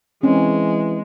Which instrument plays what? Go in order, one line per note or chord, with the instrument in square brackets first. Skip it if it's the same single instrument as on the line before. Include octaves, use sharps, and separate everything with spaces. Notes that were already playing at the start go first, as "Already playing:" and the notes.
[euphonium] E3 [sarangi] G#3 [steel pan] C4 C#4